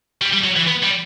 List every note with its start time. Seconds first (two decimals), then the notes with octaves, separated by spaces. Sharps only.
0.22 G3
0.33 G3
0.44 F#3
0.57 E3
0.68 B3
0.83 G3